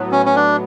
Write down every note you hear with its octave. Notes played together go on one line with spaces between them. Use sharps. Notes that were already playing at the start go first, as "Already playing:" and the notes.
Already playing: A2 F#3 B3
C#4
C#4
D4